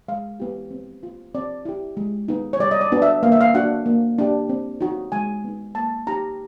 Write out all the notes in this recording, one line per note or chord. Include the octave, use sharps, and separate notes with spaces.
G#3 F5
B3 E4 G4
C4
F4
C4 D5
E4 G4
G#3
B3 D#4
C#5
G3 D5
D#5
D5
B3 D4 F#4
E5
A#3 F5
E5
F5
D4 F#4 F#5
A#3
D4 G4
C4
D#4 F#4
G#3 G#5
B3 D#4
A#3 A5
D#4 G4 A#5